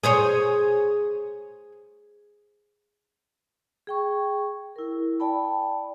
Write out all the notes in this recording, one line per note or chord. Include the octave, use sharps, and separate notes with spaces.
G#4 C5 C#5
G#4 G5 C#6
E4 A#4
D5 G5 A5 B5